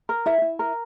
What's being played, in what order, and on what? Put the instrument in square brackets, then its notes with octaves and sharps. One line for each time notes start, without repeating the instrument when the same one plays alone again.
[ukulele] A#4
E4 E5
E4
A#4